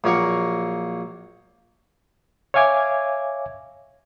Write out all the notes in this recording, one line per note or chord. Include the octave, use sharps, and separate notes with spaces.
A#1 F#3 A#3 A#4 C#6
C#5 E5 F5 G#5 D6 G#6